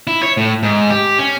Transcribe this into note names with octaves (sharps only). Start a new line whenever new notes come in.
E4
C#5
A2
G#2
G4
C#4